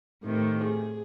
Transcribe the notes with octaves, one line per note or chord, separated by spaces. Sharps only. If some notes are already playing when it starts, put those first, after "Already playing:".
A2 C3 D#3
G#4